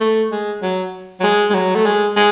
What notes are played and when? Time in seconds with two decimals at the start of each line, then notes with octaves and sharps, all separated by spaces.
0.01 A3
0.32 G#3
0.62 F#3
1.20 F#3
1.23 G#3
1.50 G#3
1.54 F#3
1.75 A3
1.86 G#3
2.16 G#3